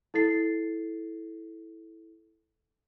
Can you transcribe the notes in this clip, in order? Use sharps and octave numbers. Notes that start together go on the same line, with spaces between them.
E4 A4 A6 C7